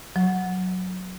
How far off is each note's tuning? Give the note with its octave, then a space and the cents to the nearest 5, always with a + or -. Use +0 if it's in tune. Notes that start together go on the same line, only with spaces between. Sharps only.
F#3 -5